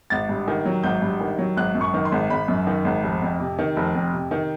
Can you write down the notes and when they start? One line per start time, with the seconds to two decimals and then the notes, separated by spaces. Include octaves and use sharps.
0.10 G#1 A6
0.29 G2
0.48 D#3
0.66 F#3
0.83 G#1 G6
1.02 G2
1.20 D#3
1.39 F#3
1.57 G#1 F#6
1.75 F#2
1.81 C#6
1.94 D#3
2.05 C6
2.12 G#1
2.30 G#1 B5
2.48 F#2
2.67 D#3
2.85 G#1
3.03 F1
3.22 F2
3.40 C3
3.59 D#3
3.76 F1
3.95 F2
4.13 C3
4.31 D#3